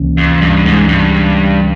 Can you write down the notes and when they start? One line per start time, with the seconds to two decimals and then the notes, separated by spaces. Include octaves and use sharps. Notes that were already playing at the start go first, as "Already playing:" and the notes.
Already playing: C#2 C3 E3 A#3 C#4
0.18 F2
0.41 G2
0.66 G#2
0.88 G2